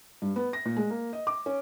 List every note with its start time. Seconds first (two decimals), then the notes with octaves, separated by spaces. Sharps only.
0.22 G2
0.36 B3
0.53 A#6
0.65 A#2
0.77 G#3
0.90 A#3
1.13 D#5
1.27 D6
1.46 C#4